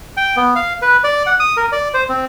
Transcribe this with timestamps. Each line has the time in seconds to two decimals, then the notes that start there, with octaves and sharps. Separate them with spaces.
0.17 G5
0.37 B3
0.55 F5
0.82 B4
1.04 D5
1.26 F#5
1.40 D#6
1.57 A#4
1.72 D5
1.94 C5
2.09 C4